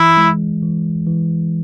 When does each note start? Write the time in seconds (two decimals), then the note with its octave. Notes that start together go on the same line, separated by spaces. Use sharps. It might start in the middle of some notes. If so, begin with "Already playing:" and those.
Already playing: E3 E4
0.17 G#3
0.62 E3
1.06 E3